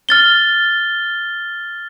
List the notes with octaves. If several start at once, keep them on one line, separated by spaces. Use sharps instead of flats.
F6 A6 G7